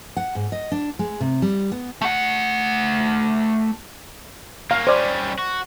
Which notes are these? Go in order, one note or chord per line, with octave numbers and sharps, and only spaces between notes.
F#5
G#2
D#5
D4
G#3
C3
G3
B3
A3 F#5
A#3 C#4 F5
G3 C#4 C5 D5
F#4